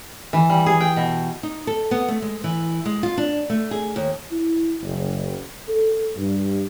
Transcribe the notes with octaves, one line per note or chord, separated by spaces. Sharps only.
E3
G3
G#4
G5
B2
D#4
A4
B3
A3
G#3
E3
G#3
F4
D4
A3
G#4
D#2
E4
F#1
A4
G2